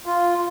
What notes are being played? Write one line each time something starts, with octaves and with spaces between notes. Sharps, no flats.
F4